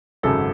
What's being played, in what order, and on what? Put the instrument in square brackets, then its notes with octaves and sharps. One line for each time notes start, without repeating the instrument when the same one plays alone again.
[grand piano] G#1 F#2 C#3 F#3 A4